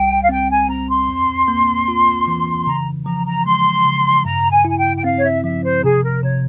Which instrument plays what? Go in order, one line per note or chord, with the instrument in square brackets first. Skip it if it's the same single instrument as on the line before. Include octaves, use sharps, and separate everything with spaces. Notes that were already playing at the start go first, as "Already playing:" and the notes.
Already playing: [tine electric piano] C2 G3 [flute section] G5
[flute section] F5
[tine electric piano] C4 [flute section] G5
[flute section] G#5
[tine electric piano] C4 [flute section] A#5
[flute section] C6
[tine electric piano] E2
A#3
F4
E3
[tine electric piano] C#3 [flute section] A#5
[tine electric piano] F3 [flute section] A#5
[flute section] A#5
[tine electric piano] G#3 [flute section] C6
[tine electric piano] C#3
[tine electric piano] G2 [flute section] A#5
[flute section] G#5
[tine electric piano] E4 [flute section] G#5
[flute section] G5
G5
[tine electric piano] C4 [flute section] F5
[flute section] C#5
E5
[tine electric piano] F3 [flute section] E5
[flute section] C5
[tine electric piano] C3 [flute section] G#4
[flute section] A#4
[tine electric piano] C3 [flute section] C#5